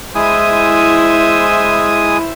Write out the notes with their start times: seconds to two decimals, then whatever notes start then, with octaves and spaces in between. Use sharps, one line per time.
0.15 G#3 E4 C5 E5 G#5 D#6